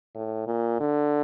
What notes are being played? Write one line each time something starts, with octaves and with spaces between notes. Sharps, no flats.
A2
A#2
D3